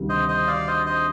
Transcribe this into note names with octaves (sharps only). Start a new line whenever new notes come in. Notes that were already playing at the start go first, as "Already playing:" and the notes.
Already playing: D2 C3 D#3 G3
C5 D#5
C5 D#5
D5 F5
C5 D#5
C5 D#5